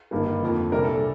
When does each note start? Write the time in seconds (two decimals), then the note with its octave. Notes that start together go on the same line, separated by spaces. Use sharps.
0.11 G1 G2 D#3 G3 A#3
0.42 F2 D3 F3 A#3
0.71 C2 A#2 G3 A#3 D4 A#4
0.84 A4